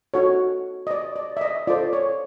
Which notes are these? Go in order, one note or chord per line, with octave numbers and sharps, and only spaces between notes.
D#4 F#4 A4 C#5
D#5
D5
D5
E5
D#5
F4 A4 C5 D5
C#5